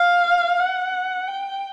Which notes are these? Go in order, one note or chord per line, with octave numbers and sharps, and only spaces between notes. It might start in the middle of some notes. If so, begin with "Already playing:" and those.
Already playing: F5
F#5
G5